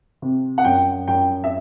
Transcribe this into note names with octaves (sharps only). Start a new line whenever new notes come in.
C3
F#5
F#2 G5
F#2 G5
E5